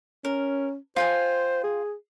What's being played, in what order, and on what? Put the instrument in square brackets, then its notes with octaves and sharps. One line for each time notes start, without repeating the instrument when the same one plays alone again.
[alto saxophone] C#4 [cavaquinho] A#4
[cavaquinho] F4 G5 G#5 [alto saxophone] C5
[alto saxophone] G#4